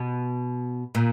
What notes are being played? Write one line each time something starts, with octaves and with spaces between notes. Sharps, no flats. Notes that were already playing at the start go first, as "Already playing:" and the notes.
Already playing: B2
A#2